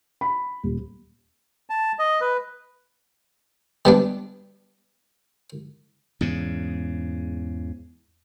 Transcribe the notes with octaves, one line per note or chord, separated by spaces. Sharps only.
B5
D#1
A5
D#5
B4
G3 B3 D4
E2 G#2 C#3